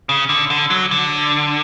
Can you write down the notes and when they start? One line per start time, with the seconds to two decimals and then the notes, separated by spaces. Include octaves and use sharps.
0.09 C#3
0.29 D3
0.50 D3
0.70 F#3
0.91 D3